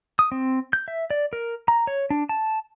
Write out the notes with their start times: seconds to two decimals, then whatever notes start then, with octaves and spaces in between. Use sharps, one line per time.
0.19 D#6
0.32 C4
0.73 G6
0.88 E5
1.10 D5
1.33 A#4
1.68 A#5
1.87 C#5
2.10 D4
2.29 A5